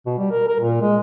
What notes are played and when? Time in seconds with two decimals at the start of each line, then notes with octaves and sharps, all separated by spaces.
0.06 B2
0.18 G3
0.31 A#4
0.48 A#4
0.60 A#2
0.82 G#3